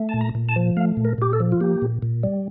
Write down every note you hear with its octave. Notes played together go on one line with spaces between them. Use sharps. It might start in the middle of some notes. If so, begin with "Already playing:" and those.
Already playing: A3
A#2 A5
A#5
A#2
A5
F3
A3 F5
A#2
A#4
A#2 G4
A4
F3
F4
A#3 G4
A#2
A#2
G3